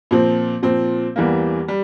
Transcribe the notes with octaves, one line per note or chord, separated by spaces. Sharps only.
A#2 F3 C4
A#2 F3 C4
E2 E3 G3 A#3
G3